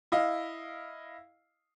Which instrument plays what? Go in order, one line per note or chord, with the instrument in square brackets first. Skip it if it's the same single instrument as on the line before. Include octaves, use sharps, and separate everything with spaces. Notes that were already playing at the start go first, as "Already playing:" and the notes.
[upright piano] E4 D#5 F5